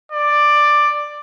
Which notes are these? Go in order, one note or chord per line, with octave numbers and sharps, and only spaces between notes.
D5